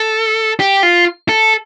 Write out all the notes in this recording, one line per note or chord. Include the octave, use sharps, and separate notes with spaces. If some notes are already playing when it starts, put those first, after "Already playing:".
Already playing: A4
G4
F4
A4